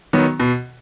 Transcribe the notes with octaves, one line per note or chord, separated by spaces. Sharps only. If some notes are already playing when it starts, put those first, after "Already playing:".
D#3 F#3 B3
B2